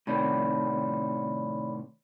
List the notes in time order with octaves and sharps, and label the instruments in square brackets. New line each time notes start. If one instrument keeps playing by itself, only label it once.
[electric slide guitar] A2 C3 D#3 [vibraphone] C#5 D5 B5